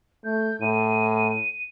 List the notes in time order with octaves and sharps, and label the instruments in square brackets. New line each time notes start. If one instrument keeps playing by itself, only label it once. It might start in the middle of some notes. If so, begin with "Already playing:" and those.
[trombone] A3 [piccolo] G6
[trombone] A2 [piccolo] D#7